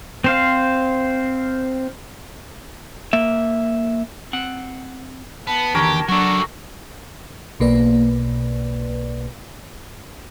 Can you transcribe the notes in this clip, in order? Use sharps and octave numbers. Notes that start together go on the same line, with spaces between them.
C4 C5 F5
A#3 E5
C4 F#5
B3 A5
D#2 D3 E3 G4 A#4 C#5
F#3 D4 F#4 A4 C#6
B1 B2 A#3 B4 D5